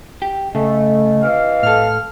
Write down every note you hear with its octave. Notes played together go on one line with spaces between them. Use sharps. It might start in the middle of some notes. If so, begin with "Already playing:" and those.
G4
C#3 A3 D#5
C3 E3 F5
A2 A4 F6